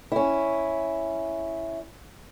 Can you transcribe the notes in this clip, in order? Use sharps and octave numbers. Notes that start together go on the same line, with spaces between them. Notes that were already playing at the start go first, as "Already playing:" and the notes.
C#4 E4